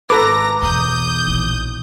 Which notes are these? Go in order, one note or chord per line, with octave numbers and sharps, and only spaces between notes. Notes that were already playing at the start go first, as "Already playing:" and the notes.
G#1 A4 B4 A#5 D6 A#6
B1 E2 D#6 G6
A#1 E3